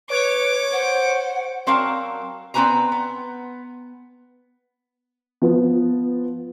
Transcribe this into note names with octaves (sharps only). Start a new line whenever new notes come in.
B4 C#5 D6
C5 F#5
F#3 C4 F#4 A#4 F5 A5
B3 C4 F#4 B4 G#5 A#5
B3
F3 B3